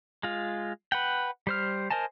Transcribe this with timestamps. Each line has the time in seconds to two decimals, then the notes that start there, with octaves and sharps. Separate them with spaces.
0.23 G#3 F4
0.92 B4 F#5 G5
1.47 G3 C5 F6
1.91 A#4 C5 D#5 G#5 A5